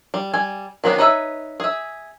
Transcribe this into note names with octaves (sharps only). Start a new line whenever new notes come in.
G3
G3 G#5
D#3 F#3 B3 C4 D4
D#4 B4 C#5 D#5 E5
G#4 E5